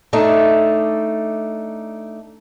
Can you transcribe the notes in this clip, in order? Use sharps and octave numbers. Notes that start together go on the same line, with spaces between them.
A3 D4 D#4